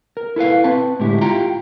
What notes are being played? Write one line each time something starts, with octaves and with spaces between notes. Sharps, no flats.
A#4
E4 A4 B4 F5
C4 B4 A5
A2 D3 G#3 E4 G4
E4 F4 G4 G5 A#5